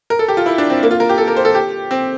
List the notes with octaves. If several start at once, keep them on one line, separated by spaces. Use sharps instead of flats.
A#4
A4
G4
F4
E4
D4
C4
A#3
F4
A#4
G4
A4
A#4
C5
A4
G4
C4